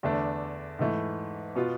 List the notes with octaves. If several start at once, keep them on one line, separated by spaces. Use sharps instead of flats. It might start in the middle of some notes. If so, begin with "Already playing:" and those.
E2 D3 A3 D4
G#2 E3 A3 E4
B2 B3 F4